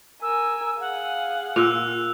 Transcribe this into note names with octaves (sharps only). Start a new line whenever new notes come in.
A#4 G#5 E6
G#4 F5 F#5
A#2 E6 F#6 F7